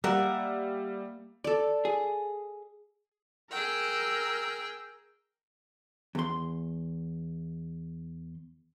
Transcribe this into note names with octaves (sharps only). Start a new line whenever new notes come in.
G3 A#3 A#4 E5 F#5
A4 D5
G#4
G#4 A#4 G5 E6
E2 C6